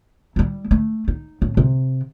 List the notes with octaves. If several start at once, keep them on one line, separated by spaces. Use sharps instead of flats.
G3 E4
A3
D#4
A2
C3